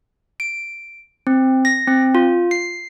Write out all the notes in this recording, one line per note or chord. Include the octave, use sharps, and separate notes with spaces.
D7
C4
A#6
C4
F4
C7